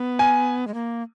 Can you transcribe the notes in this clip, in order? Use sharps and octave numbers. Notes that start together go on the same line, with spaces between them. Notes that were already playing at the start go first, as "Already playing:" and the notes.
Already playing: B3
G#5
G#3
A#3